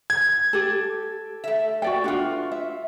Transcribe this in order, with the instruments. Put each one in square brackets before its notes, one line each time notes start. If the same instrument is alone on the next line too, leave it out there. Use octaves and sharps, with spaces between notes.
[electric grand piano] G#6
[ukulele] G4 A4
[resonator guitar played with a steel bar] A3 E5
[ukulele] F#4 D5 G5
[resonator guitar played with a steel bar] B3 F4 [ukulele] D4 F#4
[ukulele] E5